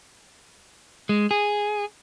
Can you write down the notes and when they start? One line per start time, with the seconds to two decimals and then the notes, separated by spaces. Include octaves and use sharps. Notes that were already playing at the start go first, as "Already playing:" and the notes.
1.09 G#3
1.31 G#4